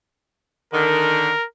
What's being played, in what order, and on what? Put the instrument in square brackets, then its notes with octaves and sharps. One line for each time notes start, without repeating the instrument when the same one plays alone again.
[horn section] D3 D#3 [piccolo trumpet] A#4